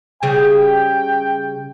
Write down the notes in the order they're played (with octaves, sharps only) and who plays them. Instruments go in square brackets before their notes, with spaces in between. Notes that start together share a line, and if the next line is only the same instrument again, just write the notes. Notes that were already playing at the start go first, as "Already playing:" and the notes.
[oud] C#3 G3 G#4 [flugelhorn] G5